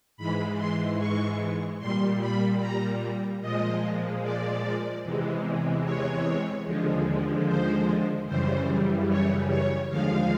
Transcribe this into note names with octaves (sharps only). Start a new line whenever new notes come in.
G#2 E3 G#3 B5
C6
C#6
A#2 G3 C6
B5
A#5
A#2 F3 G#3 D#5
D5
E2 C3 E3 G#3
C#5
D#2 D3 F3 G#3
C5
F#2 C#3 E3 G3 C5
C#5
C#5
D#2 D3 F3 G#3 F5